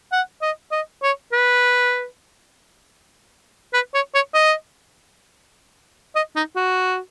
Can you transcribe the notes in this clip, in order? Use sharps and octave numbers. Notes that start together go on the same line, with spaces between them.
F#5
D#5
D#5
C#5
B4
B4
C#5
C#5
D#5
D#5
D#4
F#4